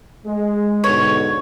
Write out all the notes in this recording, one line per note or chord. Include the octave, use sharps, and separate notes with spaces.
G#3
G#2 B2 D3 C#5